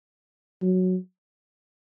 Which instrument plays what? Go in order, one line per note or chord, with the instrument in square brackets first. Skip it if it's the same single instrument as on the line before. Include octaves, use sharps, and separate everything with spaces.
[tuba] F#3